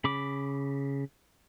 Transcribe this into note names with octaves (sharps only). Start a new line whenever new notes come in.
C#3 B5 D6